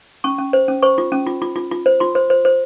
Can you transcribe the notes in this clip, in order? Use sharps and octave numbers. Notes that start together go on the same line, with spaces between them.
C#4 C#6
C#4
C5
C#4
C5 C#6
F4
C#4
F4
F4
F4
F4
C5
F4 C6
C5
C5
C5